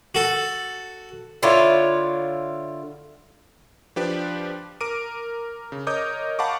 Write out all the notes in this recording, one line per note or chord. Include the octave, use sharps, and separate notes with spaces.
F#4 A4
D3 E4 F4 C#5
F3 D4 G4 B4 D5
A#4 D6 D7 D#7
C#3
A#4 C#5 D#5 D6 D#6 G6
F5 F#5 A5 B5 C#6 D6